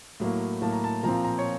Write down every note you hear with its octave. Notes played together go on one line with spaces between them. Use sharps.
A2 F#3 A#3
A2 F#3 A#3 A5
A#5
A5
A#2 F3 C4 A#5
A#5
A#5
C#5